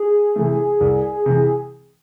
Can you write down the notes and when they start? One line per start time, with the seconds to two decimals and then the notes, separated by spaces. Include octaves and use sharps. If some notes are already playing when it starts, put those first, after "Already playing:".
Already playing: G#4
0.36 C3 E3 A3
0.80 C2
1.26 C3 E3